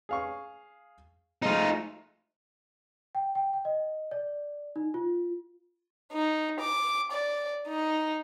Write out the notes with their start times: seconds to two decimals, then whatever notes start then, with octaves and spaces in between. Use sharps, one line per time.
0.09 G#4 F5 C#6
1.42 F3 G#3 A3 D#4 F4
3.15 G5
3.35 G5
3.53 G5
3.65 D#5
4.11 D5
4.76 D#4
4.94 F4
6.12 D#4
6.61 D6
7.12 D5
7.68 D#4